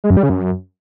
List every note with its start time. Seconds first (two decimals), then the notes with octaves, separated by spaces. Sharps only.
0.04 G#3
0.10 F#2
0.17 G3
0.23 C#3
0.30 F#2